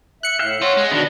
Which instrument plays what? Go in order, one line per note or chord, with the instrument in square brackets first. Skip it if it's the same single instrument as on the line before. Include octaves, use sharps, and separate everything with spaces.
[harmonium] E5 [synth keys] F#6 C#7
[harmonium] A2 [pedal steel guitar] E5 F5 G5
[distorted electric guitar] C4 F4 [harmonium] C#5 F#5
[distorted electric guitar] G#3
[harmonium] B2 D4 [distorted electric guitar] D#3 [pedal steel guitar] B3 F#4